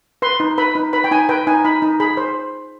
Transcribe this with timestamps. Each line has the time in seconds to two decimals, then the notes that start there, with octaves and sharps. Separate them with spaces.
0.22 B4 C6
0.40 D#4
0.58 B4 B5
0.75 D#4
0.93 B4 B5
1.04 G5
1.11 D#4 G#5
1.29 B4 G5
1.47 D#4 G#5
1.64 D#4 B5
1.82 D#4
2.00 G#4 B5
2.17 C5